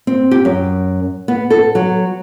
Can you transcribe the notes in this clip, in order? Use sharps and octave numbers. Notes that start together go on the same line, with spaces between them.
C4
G4
F#2
B3
A4
F#3